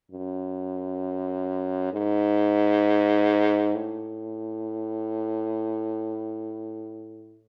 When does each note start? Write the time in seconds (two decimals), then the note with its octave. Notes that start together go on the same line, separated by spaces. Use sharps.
0.11 F#2
1.93 G#2
3.75 A2